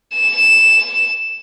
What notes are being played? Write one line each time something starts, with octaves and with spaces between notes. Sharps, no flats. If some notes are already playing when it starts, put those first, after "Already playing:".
E7